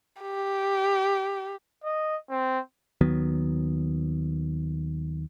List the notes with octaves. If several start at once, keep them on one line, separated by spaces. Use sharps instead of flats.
G4
D#5
C4
D#2 D#3 F#3 B3